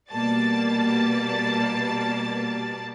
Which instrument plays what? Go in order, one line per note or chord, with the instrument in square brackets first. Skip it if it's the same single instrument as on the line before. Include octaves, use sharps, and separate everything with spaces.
[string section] B2 G3 A#3 D5 A5 A6